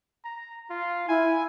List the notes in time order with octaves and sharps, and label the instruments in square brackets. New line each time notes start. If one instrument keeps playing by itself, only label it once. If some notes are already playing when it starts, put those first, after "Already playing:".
[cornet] A#5
F4
[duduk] E4 [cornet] G#5